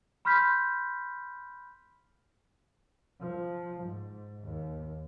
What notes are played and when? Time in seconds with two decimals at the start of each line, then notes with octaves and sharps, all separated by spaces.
0.25 B5 C6 F6 G6 B6
3.20 F3
3.83 G#2
4.44 D#2